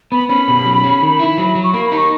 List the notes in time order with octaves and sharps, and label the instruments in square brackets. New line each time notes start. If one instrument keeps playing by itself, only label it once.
[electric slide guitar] B3 [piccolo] B5
[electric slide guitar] C#4 [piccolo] B5
[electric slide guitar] B2
F#3
C#4
D#3
E4
F#3
F#3
[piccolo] C#6
[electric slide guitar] A#3 [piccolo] B5
[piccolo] B5
[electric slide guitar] D#4 [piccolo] C#6